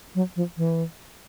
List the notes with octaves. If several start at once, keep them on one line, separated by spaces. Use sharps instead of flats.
F#3
F3
E3